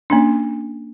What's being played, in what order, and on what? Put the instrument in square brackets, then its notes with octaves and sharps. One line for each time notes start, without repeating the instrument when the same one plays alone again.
[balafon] A#3 C#4 D4